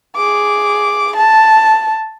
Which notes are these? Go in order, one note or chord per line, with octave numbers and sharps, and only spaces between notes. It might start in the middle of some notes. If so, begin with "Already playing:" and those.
G#4 D6
A5